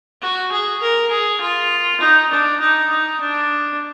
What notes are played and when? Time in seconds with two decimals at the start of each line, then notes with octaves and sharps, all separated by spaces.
0.22 F#4
0.52 G#4
0.81 A#4
1.11 G#4
1.41 F4
2.00 D#4
2.30 D4
2.60 D#4
2.90 D#4
3.20 D4